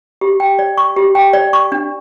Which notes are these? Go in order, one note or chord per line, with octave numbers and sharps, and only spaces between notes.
G4
G5
D5
C#6
G4
G5
D5
C#6
D4